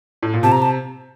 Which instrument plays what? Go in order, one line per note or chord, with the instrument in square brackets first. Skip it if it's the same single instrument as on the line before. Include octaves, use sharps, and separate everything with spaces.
[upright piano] A2
A#2
[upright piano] C3 [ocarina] A5
[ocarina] A#5
A5